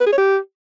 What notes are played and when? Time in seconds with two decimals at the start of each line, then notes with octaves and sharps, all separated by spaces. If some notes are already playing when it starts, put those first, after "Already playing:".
0.01 B4
0.06 G#4
0.12 C#5
0.18 G4